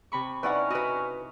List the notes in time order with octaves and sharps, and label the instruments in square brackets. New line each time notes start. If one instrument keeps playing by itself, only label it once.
[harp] C3 B5 C#6
[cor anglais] C#4 [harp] D#4 E4 [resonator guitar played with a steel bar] B4 D5 F#5
[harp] E4 D#5 [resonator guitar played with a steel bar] F#4 B4